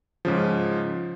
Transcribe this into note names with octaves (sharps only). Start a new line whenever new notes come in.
G#2 C#3 F3